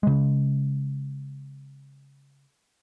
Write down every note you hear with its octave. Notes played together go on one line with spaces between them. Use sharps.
C#3 G#3